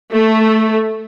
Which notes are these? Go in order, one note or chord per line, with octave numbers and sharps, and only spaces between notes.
A3